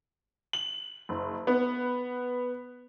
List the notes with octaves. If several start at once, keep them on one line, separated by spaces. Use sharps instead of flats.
F#7
F#1
B3